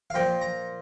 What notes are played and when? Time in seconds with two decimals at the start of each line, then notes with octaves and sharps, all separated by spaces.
0.10 F5
0.14 A#2 F3 G5
0.42 A#5